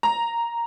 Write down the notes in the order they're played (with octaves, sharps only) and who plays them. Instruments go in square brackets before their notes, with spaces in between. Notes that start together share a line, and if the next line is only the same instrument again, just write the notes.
[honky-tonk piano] A#5